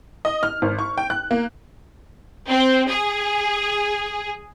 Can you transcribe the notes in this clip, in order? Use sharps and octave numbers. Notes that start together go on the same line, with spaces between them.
D#5
F6
G#1
C#6
G5
F#6
A#3
C4
G#4